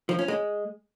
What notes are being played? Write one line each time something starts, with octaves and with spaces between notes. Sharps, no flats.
F3
C#4
G#3